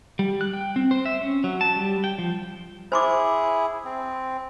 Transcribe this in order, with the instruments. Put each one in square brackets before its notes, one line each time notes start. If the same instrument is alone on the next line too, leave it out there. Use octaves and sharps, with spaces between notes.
[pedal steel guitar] G3
F#6
G5
C4
C5
E5
C#4
F#3
A5
G3
G5
F3
[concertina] E4 G#4 [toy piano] C5 C6 D6
[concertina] C4